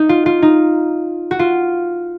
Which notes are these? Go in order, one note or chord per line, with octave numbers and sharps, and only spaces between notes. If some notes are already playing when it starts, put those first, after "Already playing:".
Already playing: D#4
F4
F4
D#4
F#4
F4